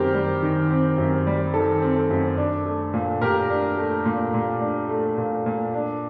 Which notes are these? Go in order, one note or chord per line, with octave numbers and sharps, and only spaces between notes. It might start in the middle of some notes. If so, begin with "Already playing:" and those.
Already playing: F#2 D#3 G3 C4 G4 A#4 C5
G3
D#3
C4
F#2
G3
D#3 A4
C4
A4
F#2
D4
A3
A#2
A#2 G4 A#4
D4
A3
A#2
A#2
D4
A3
A#2
A#2
D4